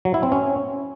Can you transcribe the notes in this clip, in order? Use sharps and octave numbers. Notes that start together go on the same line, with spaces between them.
F#3
E4
C4
C#4